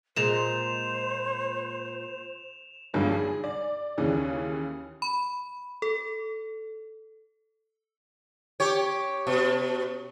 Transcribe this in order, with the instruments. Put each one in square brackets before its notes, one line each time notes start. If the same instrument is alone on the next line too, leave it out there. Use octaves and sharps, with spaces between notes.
[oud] A#2 G#3 [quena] C5 [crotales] E7 F7
[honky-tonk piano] B1 G2 D3 F3 G#3
G#4
D5
D#2 C#3 E3
[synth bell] B5
A4
[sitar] G4 C#5
B2